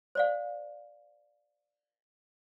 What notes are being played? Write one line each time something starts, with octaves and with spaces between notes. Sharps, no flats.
C5 D5 F5